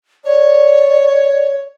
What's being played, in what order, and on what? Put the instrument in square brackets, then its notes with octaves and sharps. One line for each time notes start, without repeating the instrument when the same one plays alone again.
[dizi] C#5 [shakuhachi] D5